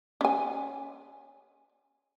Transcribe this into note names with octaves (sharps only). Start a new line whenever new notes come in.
C#4 G#5